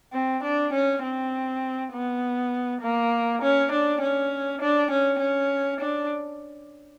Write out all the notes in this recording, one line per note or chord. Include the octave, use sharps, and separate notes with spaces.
C4
D4
C#4
C4
B3
A#3
C#4
D4
C#4
D4
C#4
C#4
D4